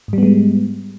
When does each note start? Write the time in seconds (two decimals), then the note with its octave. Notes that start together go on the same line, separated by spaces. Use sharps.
0.08 G#2
0.13 G3
0.18 B3
0.23 G#3